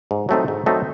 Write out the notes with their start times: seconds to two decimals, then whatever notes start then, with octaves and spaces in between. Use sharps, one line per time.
0.11 G#2
0.29 F#3 A3 C4 D#4
0.48 G#2
0.66 F#3 A3 C4 D#4